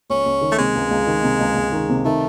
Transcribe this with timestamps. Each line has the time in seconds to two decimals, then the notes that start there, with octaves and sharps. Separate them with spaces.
0.09 C#2 C#4
0.26 C#2
0.41 D#3
0.52 A3
0.59 C3 G#3
0.75 C#2
0.91 C#2
1.07 D#3
1.24 C3
1.40 C#2
1.56 C#2
1.72 D#3
1.89 C3
2.05 D#3 A3